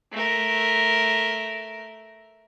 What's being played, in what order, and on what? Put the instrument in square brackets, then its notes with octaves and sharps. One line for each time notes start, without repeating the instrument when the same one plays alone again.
[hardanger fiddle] A3 A#4